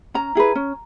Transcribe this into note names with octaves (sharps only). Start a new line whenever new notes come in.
C#4 A#5
E4 G#4 B4
C#4